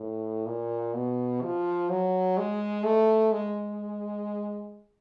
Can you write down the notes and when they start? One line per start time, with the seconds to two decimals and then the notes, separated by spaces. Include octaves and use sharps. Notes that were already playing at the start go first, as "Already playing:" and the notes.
Already playing: A2
0.46 A#2
0.94 B2
1.42 F3
1.90 F#3
2.38 G#3
2.85 A3
3.32 G#3